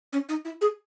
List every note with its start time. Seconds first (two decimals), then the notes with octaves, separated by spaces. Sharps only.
0.13 C#4
0.29 D#4
0.45 E4
0.61 G#4